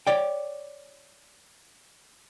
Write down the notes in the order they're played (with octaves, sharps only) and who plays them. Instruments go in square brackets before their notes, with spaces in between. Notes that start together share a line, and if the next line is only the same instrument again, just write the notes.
[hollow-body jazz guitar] C#5 D5 G5